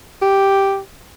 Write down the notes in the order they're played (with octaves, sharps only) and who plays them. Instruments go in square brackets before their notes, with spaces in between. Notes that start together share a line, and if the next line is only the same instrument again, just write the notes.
[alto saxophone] G4